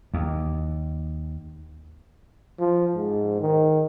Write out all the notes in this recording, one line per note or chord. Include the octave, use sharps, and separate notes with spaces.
D#2
F3
G#2
D#3